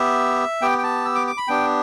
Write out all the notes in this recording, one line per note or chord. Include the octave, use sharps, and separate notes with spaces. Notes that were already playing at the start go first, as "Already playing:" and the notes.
Already playing: B3 G4 E5
B3 G4 G5
G5
A5
E6
D6
D6
B5
B3 D4 G4 G5